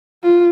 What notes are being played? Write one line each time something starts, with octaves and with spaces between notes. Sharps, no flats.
F4